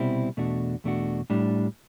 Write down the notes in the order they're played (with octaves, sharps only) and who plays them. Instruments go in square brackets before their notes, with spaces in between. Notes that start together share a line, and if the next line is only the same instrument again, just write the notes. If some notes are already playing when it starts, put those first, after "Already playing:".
Already playing: [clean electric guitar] C2 B2 G3 C4 E4
E2 B2 A3 D4 F#4
E2 B2 A3 D4 F#4
A2 G3 D4